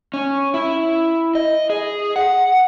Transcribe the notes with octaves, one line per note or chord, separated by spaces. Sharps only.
C#4
E4
D#5
G#4
F#5